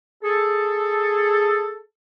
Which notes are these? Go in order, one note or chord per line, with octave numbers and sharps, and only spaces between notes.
G#4 A4